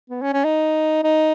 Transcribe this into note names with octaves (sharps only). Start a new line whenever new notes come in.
B3
C#4
C#4
D#4
D#4